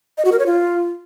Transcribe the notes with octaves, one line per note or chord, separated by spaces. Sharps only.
D#5
F#4
A#4
C#5
F4